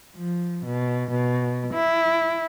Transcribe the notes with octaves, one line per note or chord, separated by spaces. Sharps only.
F3
B2
B2
E4